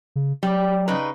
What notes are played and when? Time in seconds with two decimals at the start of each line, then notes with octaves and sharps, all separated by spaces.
0.16 C#3
0.43 F#3 G3
0.88 C#3 D#4 B4